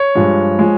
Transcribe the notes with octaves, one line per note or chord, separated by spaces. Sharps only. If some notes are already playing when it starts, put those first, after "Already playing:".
Already playing: C#5
G2 F3 G#3
F3 G#3